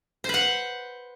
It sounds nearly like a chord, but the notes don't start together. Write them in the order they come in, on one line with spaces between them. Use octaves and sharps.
C5 B4 F#5